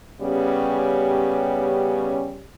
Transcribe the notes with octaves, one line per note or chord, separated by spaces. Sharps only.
C#3 G3 B3 C#4 G4